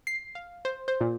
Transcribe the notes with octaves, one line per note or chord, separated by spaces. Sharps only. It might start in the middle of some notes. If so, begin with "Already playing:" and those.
C7
F5
C5
C5
A#2